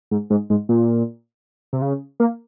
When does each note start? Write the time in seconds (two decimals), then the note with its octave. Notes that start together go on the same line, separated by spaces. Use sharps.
0.11 G#2
0.30 G#2
0.50 G#2
0.69 A#2
1.73 C3
1.82 C#3
2.20 A#3